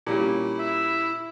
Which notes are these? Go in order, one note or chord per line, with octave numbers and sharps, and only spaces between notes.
A#2 G3 C#4 E4
E5